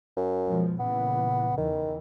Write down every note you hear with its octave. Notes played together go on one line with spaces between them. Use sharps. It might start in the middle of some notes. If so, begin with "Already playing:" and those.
F#2
B2 F3 G#3
A#2 C#3 E3 B3
E2 D#3 E3